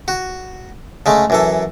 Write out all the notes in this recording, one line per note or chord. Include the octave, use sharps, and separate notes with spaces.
F#4
C#3 G#3 A3
F#2 E3 A4